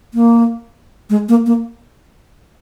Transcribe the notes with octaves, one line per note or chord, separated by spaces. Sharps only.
A#3
G#3
A#3
A#3